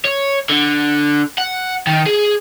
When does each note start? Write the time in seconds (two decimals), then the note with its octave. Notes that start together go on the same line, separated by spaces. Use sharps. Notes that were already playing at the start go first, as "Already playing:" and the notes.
0.05 C#5
0.50 D3
1.38 F#5
1.87 D#3
2.06 G#4